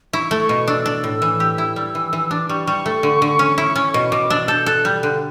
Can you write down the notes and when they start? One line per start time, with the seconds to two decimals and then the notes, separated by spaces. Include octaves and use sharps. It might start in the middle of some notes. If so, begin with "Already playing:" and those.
0.13 E4 C#6
0.31 A3
0.40 C#6
0.49 B2
0.68 D4 E6
0.86 D4
1.04 A2
1.22 E3
1.40 G4
1.58 E4
1.76 G3
1.95 E3
2.13 E3
2.31 D4 D6
2.49 G3 C#6
2.67 G3 C#6
2.86 A3
3.03 D3
3.22 D3
3.39 C#4
3.58 E4
3.76 C#4
3.94 B2 C#6
4.12 B2 D6
4.30 D4 E6
4.48 A4 G6
4.66 A4 F#6
4.85 G3 G6
5.03 D3 F#6